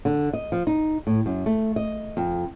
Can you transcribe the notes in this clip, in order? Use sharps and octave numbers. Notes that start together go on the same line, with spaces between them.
D3
D#5
F3
D#4
A2
F#2
A3
D#5
F2